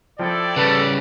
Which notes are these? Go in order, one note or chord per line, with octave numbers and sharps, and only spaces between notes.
F3 E4 A4 D5 G5
C#3 G3 A4 B4